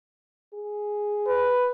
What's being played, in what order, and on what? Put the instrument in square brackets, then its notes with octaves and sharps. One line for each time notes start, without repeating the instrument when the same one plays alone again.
[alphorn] G#4
[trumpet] B4